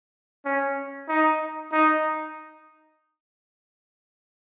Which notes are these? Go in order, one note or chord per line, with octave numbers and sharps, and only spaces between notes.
C#4
D#4
D#4